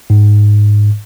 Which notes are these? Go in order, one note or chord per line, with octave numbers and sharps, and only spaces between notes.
G#2